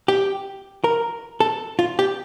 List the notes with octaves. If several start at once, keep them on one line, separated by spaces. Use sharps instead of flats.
G4
A#4
A4
F4
G4